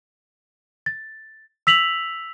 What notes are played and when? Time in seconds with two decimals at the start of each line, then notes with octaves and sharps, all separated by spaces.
0.86 A6
1.67 E6 B6 F7 F#7